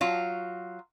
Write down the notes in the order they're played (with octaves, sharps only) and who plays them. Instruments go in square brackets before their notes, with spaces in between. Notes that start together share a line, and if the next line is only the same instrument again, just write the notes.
[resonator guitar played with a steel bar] F#3 F4